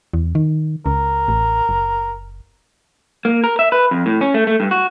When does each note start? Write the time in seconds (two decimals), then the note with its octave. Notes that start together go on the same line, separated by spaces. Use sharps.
0.14 E2
0.35 D#3
0.86 C#2 A#4
1.28 A1
1.69 F#1
3.25 A#3
3.44 A#4
3.59 E5
3.72 B4
3.91 F2
4.06 A2
4.21 C#4
4.34 A3
4.47 A3
4.60 G2
4.71 F#4